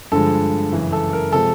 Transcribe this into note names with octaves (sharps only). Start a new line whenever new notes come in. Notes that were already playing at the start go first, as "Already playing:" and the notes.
G2 D3 F3 G#3 A4
F#2 C#3 E3
A4
A#4
C3 F3 G#3 A4